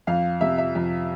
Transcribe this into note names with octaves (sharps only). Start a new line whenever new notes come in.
F2 F5
C3 E5
E5
F2